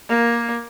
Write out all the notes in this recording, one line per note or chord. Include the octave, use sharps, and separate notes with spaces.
A#3